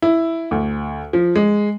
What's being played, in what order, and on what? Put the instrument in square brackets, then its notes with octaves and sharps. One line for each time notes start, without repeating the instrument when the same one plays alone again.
[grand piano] E4
D2
F3
G#3